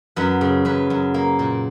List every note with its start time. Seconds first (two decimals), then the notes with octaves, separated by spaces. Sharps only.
0.16 F#2 B4
0.41 C#3
0.65 F#2 B4
0.90 F#2
1.14 A#3
1.39 A#2